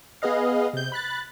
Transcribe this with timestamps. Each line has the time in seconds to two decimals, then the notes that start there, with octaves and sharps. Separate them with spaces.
0.22 B3 G#4 B4 D#5 F5
0.73 C3 G6
0.92 B5 F#6 A6